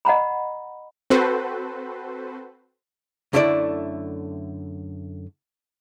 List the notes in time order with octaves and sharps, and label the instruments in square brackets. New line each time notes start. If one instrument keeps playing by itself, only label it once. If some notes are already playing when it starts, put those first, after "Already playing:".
[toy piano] D#5 F#5 A#5 B5
[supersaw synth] C4 F#4 A4 B4 C5
[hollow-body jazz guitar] F#2 D3 A3 E4 A#4 D5